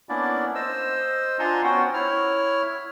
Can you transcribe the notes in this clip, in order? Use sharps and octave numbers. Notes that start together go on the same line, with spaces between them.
A#3 B3 C#4 D4 E4 D5
C5 D#5 E6
D4 F4 F#5 G#5 A#5 C6
B3 C#4 F#4 C5 F#5 G5
E4 C#5 F6